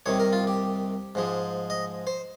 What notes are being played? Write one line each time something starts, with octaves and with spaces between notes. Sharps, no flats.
C2 C3 D#3 C#5
A#4
F4
G4
G#2 F3 G#3
D#5
C5